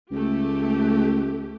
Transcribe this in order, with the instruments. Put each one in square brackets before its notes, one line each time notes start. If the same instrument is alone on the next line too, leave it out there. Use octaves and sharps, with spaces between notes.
[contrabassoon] C#2 [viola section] A3 G4